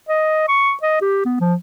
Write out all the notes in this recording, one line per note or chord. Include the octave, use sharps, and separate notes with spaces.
D#5
C#6
D#5
G4
B3
F3